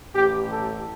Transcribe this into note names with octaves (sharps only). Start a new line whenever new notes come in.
A1 A2 G4
A4